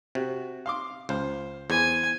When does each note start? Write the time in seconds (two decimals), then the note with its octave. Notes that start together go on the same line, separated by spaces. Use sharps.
0.15 C3 F#4
0.66 F5 C6 D6
1.09 C#2 C5 F5
1.70 E2 C5 G#5